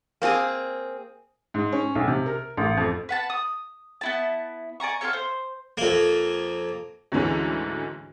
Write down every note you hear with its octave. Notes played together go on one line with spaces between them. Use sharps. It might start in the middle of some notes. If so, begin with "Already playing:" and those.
A#3 C4 F#4 G#4
G#2
C#4
B1
C3
A#4
A1
F2
B4 F#5 A5
D#6
B3 E4 A5
D5 G#5 A#5 C#6
F4 G4 A4 C#5
C5
F2 A#3
D2 G#2 D3 E3 G#3 C#4